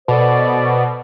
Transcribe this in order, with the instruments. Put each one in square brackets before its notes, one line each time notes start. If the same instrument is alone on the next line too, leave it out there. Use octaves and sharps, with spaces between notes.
[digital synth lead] B2 [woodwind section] A4 C5 D5